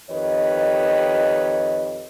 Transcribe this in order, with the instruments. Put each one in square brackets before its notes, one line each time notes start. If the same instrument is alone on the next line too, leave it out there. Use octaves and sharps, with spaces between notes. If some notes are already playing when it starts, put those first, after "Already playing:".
[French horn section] F2 D#3 G4 B4 C#5 D#5